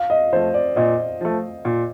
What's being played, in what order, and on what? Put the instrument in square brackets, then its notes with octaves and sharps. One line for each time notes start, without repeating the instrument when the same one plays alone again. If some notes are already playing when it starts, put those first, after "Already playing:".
Already playing: [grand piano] F5
D#5
[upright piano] F3 A3 [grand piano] C5
[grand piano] D5
[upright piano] A#2 [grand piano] D#5
[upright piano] F3 A3
A#2